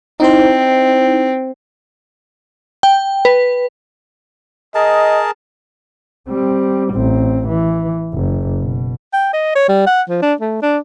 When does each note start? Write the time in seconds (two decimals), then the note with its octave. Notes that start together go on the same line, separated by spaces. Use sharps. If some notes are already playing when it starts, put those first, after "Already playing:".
0.20 C4 D#4 E4 C5
2.83 G5
3.25 B4
4.75 G#4 A#4 D#5 A5
6.28 G3 C4
6.92 A1 C4
7.48 E3
8.13 F#1
8.58 B2
9.13 G5
9.33 D#5
9.55 C#5
9.68 G3
9.87 F#5
10.09 F3
10.22 D4
10.41 A3
10.62 D4